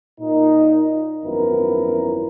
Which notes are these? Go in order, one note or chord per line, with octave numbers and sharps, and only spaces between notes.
A#2 D#4
G#1 F#2 F3 B3 E4 A#4